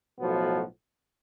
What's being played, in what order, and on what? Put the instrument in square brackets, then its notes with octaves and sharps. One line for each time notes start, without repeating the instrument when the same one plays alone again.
[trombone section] B1 A2 F3 B3 F#4